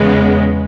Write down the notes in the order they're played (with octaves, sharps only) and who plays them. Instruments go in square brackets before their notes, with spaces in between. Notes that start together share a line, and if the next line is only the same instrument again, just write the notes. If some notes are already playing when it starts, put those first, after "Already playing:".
Already playing: [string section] E2 C#3 G#3 B3